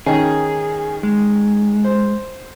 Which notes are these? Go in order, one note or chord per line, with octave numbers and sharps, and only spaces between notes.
D#3 C#4 G#4 G5
G#3
C5